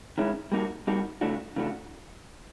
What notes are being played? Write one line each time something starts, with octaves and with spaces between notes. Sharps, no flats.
D#3 G#3 C#4 E4
G3 A#3 D#4 F#4
G3 A#3 D#4 F#4
C#3 E3 A3 D4 F#4
C#3 E3 A3 D4 F#4